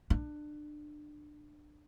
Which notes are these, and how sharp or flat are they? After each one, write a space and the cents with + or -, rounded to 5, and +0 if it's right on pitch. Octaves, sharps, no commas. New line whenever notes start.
D4 +25